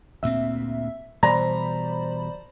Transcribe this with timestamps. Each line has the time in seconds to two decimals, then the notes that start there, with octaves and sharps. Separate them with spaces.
0.23 D2 A#2 C4 E5
1.23 B2 E3 G3 C5 D5 A#5 B5